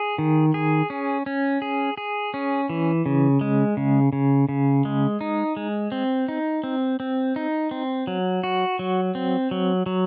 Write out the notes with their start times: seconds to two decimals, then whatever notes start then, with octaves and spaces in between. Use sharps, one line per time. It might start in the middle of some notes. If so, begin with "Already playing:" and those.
Already playing: G#4
0.18 D#3
0.54 G#4
0.90 C#4
1.26 C#4
1.62 G#4
1.97 G#4
2.34 C#4
2.70 E3
3.06 C#3
3.41 G#3
3.77 C#3
4.13 C#3
4.49 C#3
4.85 G#3
5.21 D#4
5.57 G#3
5.92 C4
6.28 D#4
6.64 C4
7.00 C4
7.36 D#4
7.71 C4
8.07 F#3
8.44 F#4
8.79 F#3
9.15 C4
9.51 F#3
9.86 F#3